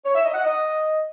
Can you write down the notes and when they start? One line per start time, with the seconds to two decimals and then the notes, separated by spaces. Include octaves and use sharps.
0.04 C#5
0.14 E5
0.24 D#5
0.34 F#5
0.43 D#5